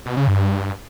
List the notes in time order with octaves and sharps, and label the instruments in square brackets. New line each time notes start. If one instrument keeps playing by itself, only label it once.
[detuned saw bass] B2
C#3
G2